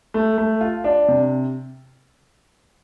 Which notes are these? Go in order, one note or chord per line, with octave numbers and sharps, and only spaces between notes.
A3
A3
F4
D4
C3